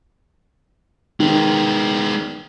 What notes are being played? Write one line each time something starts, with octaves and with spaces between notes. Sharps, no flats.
D#3 G#3 B3